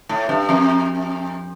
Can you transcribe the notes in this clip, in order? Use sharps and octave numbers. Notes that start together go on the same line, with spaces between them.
A2
G2
F2